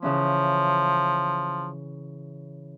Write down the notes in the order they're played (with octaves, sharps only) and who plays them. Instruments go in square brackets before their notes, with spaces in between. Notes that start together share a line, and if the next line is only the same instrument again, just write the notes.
[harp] C#3 E3 C#4 [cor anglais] F3